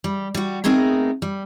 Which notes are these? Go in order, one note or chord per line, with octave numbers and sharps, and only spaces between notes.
G3
G3 F#4
A3 B3 C4 D#4 G#4 A#4
G3